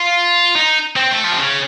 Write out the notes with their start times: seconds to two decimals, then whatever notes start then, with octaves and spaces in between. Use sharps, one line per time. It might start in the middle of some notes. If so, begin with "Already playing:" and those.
Already playing: F4
0.55 D#4
0.96 C4
1.11 A3
1.24 F3
1.32 C3
1.38 C#3